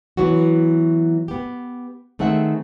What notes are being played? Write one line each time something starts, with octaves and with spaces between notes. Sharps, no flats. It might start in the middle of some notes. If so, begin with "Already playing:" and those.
E3 F#3 B3 F#4
B3 G4
D#3 A3 C4 G#4 E5 F#5